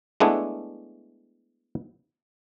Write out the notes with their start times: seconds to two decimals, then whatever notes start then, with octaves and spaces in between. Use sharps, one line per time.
0.20 G#3 A3 B3 D4 E4